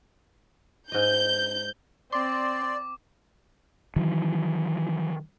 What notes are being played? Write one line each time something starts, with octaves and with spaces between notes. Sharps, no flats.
G#2 D#5 G6
C4 D5 C6 D6
D#3 E3 F#3